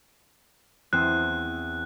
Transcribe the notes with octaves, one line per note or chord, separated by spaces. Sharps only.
E2 C4 F#6